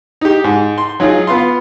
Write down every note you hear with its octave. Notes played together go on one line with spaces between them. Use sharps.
D#4 G4
G#2
C6
F#3 D#4 F4 G#4
B3 F4 C6